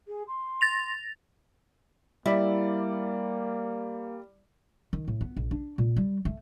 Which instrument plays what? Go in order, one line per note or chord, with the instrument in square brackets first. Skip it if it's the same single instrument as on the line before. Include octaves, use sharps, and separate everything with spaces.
[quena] G#4
C6
[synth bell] A6 A#6 F7
[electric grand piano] G3 D5 [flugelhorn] A#3 [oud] E4
[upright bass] D#3
A2
B3
A#1
D4
A#2
G3
A3